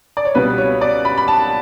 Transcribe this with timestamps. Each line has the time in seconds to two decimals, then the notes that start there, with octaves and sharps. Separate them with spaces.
0.17 D5
0.25 C#5
0.35 C#2 B2 G3 B3 B4
0.58 C#5
0.81 D5
1.05 B5
1.18 B5
1.28 A5